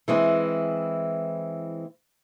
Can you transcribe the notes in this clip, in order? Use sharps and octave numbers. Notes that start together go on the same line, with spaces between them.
E3 G#3 C4 E4